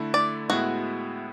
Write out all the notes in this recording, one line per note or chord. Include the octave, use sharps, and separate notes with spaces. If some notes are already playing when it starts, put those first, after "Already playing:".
Already playing: D3 A3 E4
D5
A2 G#3 B3 E4 F#4